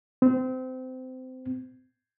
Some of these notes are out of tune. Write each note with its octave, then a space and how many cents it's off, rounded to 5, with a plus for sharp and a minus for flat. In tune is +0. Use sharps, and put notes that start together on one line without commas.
C4 -25